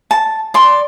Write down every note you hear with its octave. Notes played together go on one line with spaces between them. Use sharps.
A5
D5 C6